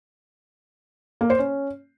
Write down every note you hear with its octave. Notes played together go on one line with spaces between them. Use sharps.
A#3
C5
C#4